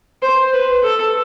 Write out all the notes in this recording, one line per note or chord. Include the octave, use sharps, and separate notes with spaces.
C5
B4
A4